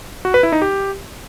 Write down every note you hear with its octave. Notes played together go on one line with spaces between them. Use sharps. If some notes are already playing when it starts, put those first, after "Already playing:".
F#4
B4
E4
D#4
G4